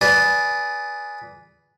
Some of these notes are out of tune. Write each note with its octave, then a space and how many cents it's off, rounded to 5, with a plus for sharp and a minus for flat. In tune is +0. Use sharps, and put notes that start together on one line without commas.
G#4 +0 B4 +0 D5 -15